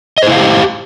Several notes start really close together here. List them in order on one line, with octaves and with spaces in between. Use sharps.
D#5 C5 E4 F5 G4